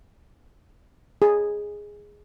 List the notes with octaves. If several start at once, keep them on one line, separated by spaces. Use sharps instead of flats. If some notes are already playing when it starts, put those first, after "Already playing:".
G#4